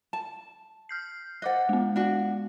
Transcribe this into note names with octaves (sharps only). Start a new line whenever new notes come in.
A5
F6 G6 C7
C5 D#5 F#5 D6 F#6
G#3 B3
D4 F#4